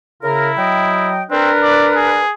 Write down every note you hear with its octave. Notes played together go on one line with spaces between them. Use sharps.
C#3 E4 A#4
F#3 D#5 G5
C4 D4 A#4 B4
D5
G#4